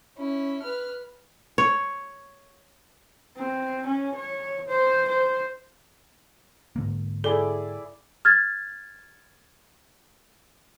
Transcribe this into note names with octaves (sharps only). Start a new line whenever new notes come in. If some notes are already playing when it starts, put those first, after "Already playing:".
C#4 E4
B4 F6
C#5
C4
C#4
C#5
C5
C5
G#2 D3 A#3
E4 G#4 A4 D5
F6 G#6 A6